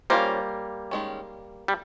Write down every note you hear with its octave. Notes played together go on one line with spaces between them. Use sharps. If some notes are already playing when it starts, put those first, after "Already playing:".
G3 A#3 C#4 F4 C5
D#3 G#3 C#4
G3